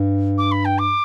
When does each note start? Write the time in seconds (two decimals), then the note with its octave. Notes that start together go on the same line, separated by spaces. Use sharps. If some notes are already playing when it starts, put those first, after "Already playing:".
Already playing: G2
0.38 D6
0.51 B5
0.65 G5
0.78 D6